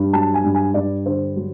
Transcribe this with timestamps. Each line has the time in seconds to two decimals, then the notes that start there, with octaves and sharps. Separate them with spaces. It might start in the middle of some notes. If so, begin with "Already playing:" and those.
Already playing: G2
0.13 F#3 A5
0.34 G#5
0.44 G2
0.54 G#5
0.74 G2 D5
1.06 D3 C5
1.36 F#3